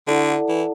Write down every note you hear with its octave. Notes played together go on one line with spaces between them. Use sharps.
D3 E4 A4 D5 F#5 A5
E3